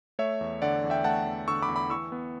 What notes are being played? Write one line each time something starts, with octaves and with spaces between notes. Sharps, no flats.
A3 C#5 E5
E2
D3 D5 F#5
E2
E5 G5
A3 F#5 A5
E2
D3 C#6 E6
B5 D6
E2
B5 D6
E3 C#6 E6
B3